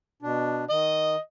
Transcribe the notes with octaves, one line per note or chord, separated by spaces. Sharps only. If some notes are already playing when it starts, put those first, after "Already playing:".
B2 D4
D#3 D#5